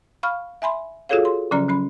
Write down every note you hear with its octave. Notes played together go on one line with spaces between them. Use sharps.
F5 B5 C#6 F6
E5 G#5 B5 C6
F4 F#4 G#4 A4 C#5 F5
C6
C#3 F3 F#3 C#4 D5 A#5
F#3 C#4 B5